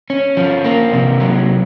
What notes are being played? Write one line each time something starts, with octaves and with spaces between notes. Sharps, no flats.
C#4
F3
A#3
C3
F#3